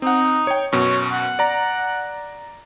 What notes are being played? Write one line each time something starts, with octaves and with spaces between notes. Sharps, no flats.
C4 D#4 F#5
C#5 G5
F#2 B2 C#5
F#5
D5 A#5